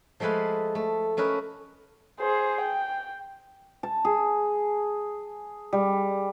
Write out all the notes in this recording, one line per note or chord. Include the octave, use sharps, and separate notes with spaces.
F3 G#3 A3 G#4 B4 F5
A3
A3 C#4 A#4 B4 D#5
G#4 C5
G5
A5
G#4
G3